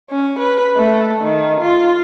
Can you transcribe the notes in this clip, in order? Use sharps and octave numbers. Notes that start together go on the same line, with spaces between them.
C#4
B4
A3
D#3
F4